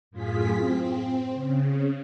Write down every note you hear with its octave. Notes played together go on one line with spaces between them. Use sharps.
F#2 A2 F4 G#4 B6
C4
C#3